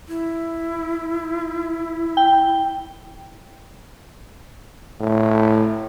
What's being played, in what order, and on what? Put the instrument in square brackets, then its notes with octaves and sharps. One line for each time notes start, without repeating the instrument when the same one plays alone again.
[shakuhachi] E4
[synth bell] G5
[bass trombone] A2